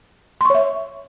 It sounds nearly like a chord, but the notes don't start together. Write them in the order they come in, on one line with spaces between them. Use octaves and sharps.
C6 C#6 C#5 E5